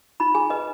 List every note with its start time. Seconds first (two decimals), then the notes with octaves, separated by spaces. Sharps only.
0.20 D#4 B5
0.35 G#4 G#5
0.50 B4 D#5